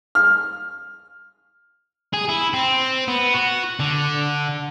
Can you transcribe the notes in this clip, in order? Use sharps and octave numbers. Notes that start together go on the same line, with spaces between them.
F6
G#4
E4
C4
B3
F#4
D3